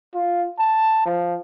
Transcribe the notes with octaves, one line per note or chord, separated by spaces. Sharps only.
F4
A5
F3